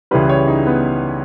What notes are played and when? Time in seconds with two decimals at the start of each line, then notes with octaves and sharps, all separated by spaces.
0.11 C#2 C#3 E3 G3 B4
0.29 C#5
0.48 D#4
0.67 B3